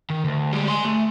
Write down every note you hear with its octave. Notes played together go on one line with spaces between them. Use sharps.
D#3
D2
G3 G#3
G#5 C6
A3